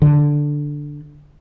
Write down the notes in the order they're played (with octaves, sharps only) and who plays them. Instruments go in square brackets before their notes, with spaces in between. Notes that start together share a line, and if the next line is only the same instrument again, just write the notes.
[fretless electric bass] D3